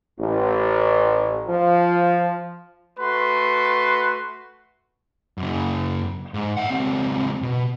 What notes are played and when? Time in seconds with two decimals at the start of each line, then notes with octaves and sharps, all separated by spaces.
0.19 A1
1.48 F3
2.99 A3 F#4 B4 C6
5.38 F#2 C#3
6.34 G#2
6.57 E5 F#5
6.70 C#2 C4
7.42 B2